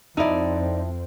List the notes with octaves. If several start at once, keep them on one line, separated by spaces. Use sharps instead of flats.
F2 C4 D#4 E4 A4 D5